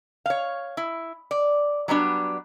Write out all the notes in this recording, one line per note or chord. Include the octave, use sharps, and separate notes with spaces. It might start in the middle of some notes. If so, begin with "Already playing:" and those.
C#5 F5
E4
D5
F#3 G3 B3 D4